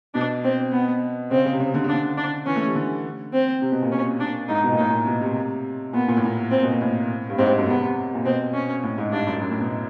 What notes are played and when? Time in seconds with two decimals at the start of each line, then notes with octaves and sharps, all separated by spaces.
0.14 B2 D4
0.44 C4
0.73 B3
1.31 C#3 C4
1.45 C#3
1.53 C3
1.60 C#3
1.74 D3
1.84 C#3 D4
1.93 D3
2.17 D4
2.46 E3 C#4
2.56 A3
2.66 G3
2.75 D3
3.33 C4
3.62 C3
3.72 B2
3.82 A#2
3.92 C#4
4.20 D4
4.48 G#2 D#4
4.64 B2
4.72 A#2
4.77 A2 D#4
4.90 A#2
5.07 B2
5.21 C3
5.93 A#2 B3
6.08 A#2
6.17 A2
6.25 A#2
6.51 C4
6.63 B2
6.71 A#2
6.81 A2
7.29 G2
7.38 G#2 C4
7.48 G2
7.58 F#2
7.67 C3 B3
7.82 C3
8.15 A#2
8.25 B2 C4
8.54 C#4
8.83 A2
8.98 G#2
9.12 G2 D4
9.27 F#2
9.41 F#2
9.51 A2
9.60 B2